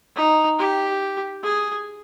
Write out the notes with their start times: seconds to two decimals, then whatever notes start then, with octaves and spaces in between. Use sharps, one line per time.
0.16 D#4
0.59 G4
1.43 G#4